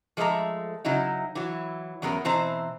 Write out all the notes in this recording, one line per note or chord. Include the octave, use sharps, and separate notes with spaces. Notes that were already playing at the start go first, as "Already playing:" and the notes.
F3 G#3 A3 A4 E5 A#5
C#3 F#3 D#4 E4
E3 F#3
E2 F#3 B3 C#4 A#4
B2 E3 C4 C5 A#5